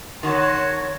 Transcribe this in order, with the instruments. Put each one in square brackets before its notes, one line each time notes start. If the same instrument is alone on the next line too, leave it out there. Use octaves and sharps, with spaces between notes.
[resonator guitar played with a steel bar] D#3 [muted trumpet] F#4 [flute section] C#5 [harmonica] F#5 A5 C6